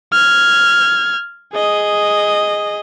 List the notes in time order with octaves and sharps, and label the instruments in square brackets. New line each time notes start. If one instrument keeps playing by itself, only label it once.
[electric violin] F6 G#6
G#4 D#5